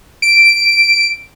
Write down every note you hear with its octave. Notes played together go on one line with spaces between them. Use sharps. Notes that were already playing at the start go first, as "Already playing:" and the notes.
D7